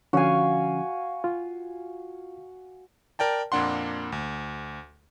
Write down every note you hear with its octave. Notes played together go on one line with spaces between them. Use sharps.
D3 F3 C#4 F#4 F5 G#5
F4
A#4 D5 G5 A5
F2 A#2 A#3 D4 F#5 C6
D2